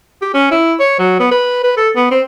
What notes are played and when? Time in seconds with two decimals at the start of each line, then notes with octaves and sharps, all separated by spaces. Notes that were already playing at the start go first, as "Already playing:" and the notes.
0.22 G4
0.34 C#4
0.51 E4
0.80 C#5
0.99 F#3
1.20 B3
1.31 B4
1.64 B4
1.77 A4
1.96 B3
2.11 C4